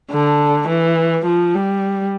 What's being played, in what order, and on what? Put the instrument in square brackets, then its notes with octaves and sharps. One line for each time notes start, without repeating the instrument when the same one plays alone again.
[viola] D3
E3
F3
G3